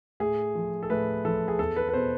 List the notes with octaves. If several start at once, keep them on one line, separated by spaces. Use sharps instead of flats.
A2 G#4
F3
A4
A2 B4
F3 A4
G#4
E2 A4
B4
B4
B2 C5